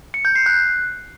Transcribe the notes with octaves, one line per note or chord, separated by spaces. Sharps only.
C#7
G6
C7
F#6